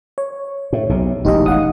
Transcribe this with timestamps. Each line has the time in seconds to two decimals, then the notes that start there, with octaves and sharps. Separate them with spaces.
0.18 C#5
0.73 A2
0.89 B1 C3
1.25 E1 A1 D#4 G4 D#5
1.46 F5 F#5 D#6